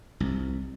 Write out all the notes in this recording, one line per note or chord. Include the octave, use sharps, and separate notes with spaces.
C2